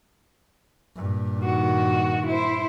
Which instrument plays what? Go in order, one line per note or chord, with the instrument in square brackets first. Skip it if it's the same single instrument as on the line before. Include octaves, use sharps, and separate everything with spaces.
[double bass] G2 A#2
[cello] D#3 F#4
E4 C5